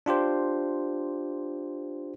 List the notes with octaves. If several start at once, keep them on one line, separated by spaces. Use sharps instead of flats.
D4 F4 G4 C5